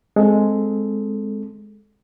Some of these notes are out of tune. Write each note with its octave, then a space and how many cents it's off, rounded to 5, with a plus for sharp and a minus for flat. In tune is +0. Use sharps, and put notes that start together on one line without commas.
G#3 +5 C4 +0 A4 +0